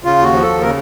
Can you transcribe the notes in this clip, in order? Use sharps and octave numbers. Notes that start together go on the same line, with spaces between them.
C#3 F4
D#2 F#4
F3
D#2 A4
C#3 A#4